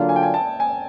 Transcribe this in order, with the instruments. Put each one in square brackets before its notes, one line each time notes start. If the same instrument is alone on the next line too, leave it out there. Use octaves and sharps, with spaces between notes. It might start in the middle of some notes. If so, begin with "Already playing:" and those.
Already playing: [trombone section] D3 F#3 A#3 D4 F4
[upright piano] G#5
G5
G#5
A5
G#5